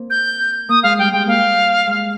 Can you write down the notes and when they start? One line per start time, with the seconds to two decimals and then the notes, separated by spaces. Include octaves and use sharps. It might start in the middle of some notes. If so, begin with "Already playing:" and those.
Already playing: A#3 C4
0.10 G6
0.69 A#3 D#6
0.83 G#3 F5
0.98 G3 G5
1.13 G#3 G5
1.27 A#3 F5
1.87 G#3